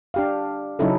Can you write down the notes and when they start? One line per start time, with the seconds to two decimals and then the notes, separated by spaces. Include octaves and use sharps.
0.14 D4 G4 F5
0.79 C#3 F#3 C#4 D#4 E4 A4